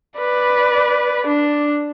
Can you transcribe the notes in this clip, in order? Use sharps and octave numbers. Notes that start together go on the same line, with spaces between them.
B4 D5
D4